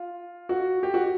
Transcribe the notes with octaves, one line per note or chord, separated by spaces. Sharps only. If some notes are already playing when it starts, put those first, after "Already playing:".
Already playing: F4
F#4
G4
F#4